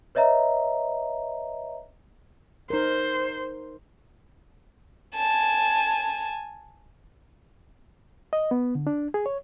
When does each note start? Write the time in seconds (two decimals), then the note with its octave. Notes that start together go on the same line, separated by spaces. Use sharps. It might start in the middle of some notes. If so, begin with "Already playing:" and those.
0.15 B4 C#5 D#5 E5 A#5
2.70 D#4 A#4 C5
5.15 G#5 A5
8.33 D#5
8.51 B3
8.75 D3
8.87 D4
9.14 G#4
9.26 C#5